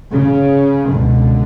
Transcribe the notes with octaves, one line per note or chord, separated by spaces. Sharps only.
C#3
C#2 B2 D3